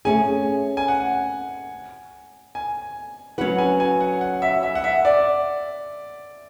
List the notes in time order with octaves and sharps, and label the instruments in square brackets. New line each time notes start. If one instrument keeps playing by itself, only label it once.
[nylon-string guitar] A3 C#4 G#4 [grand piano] G#5
[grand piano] G#5
F#5
G#5
[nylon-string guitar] F#3 C#4 F#4 B4 [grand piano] F#5
[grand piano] G#5
G#5
F#5
F#5
E5
E5
F#5
E5
D5